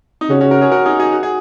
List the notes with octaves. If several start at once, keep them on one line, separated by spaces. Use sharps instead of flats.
D#4
C#3 C#4 F#4
C#4 F#4
F#4 A#4
G#4 C#5
F#4 A#4
D#4 G#4
D#4 G#4
F#4
G#4